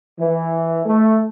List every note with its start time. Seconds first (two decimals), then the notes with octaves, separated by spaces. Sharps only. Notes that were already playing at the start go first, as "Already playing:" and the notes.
0.19 E3
0.85 A3